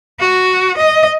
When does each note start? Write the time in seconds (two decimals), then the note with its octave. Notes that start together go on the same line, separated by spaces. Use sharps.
0.20 F#4
0.77 D#5